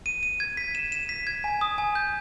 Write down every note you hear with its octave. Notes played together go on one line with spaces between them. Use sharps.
D#7
D#7
G#6
B6
E7
E7
B6
G#6
G#5
D#6
G#5
G6